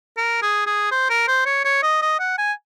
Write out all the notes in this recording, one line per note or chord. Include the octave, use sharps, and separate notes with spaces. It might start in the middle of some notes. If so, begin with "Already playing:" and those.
A#4
G#4
G#4
C5
A#4
C5
C#5
C#5
D#5
D#5
F#5
G#5